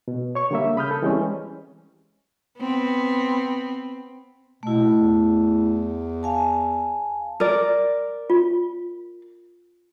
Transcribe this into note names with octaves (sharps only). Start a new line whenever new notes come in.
B2
C#5 C#6
D3 G3 A#3 E5
C#3 B5 D#6 F6 G6
A4
E3 G3 G#3 C4 C#4
B3 C4
B2 A3 E4
E2
F5 G#5 A5
A#4 D5
F4